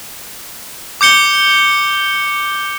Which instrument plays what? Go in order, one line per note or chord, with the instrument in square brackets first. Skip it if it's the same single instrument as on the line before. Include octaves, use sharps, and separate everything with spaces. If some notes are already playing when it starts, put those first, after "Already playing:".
[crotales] D6 G6 C#7 G7